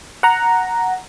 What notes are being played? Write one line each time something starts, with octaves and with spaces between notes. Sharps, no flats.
F#5 A#5